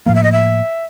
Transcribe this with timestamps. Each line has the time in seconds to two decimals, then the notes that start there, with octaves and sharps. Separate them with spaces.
0.06 A2 F3 A#3 F5
0.15 E5
0.23 D#5
0.32 E5